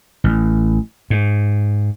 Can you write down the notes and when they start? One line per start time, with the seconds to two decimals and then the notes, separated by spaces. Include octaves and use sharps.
0.24 A1
1.10 G#2